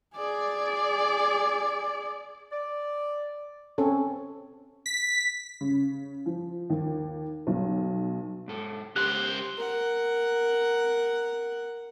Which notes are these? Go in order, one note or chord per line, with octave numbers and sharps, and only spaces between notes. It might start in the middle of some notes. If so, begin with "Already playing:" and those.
G#4 D5
D5
C4 C#4 A4
B6
C#3
F3
D#2
B1
G#2 A4
C#2 G4 A#4 C5 F#6
A#4 F#5